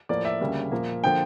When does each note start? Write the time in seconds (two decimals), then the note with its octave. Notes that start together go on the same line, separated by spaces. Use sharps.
0.09 A2 F3 A#3 D5
0.25 E5
0.41 D2 C#3 G3 A#3
0.71 A#2 F3 A#3
1.04 D3 F3 A#3 G5